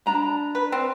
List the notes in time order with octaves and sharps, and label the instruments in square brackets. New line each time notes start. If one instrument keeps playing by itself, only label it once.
[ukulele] D4 A#5 B5
[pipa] B4
C4